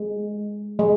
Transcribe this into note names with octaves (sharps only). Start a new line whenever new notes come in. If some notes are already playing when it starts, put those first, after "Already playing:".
Already playing: G#3
G#3